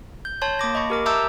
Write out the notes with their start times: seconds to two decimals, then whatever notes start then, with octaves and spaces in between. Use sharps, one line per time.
0.25 G6
0.42 C#5 A5 C6 G6
0.59 A#3 A5 D6 A#6
0.75 D#5 B5 C#6
0.90 G4 A#4 D6
1.06 E5 A5 A#5 D6 E6 G6